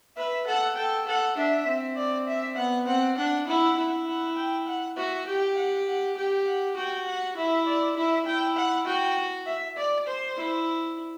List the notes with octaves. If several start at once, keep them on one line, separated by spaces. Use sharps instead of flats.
B4 E5
A4 F#5
A4 G5
A4 F#5
D4 E5
C4
D5
E5
B3 F#5
C4 F#5
D4 F#5
E4 F#5
E4
F#5
G5
F#5
F#4 E5
G4 G5
F#5
F#5
G4 G5
F#5
F#4 G5
F#5
E4 E5
D5
E4 E5
E4 G5
F#5
F#4 G5
E5
D5
C5
E4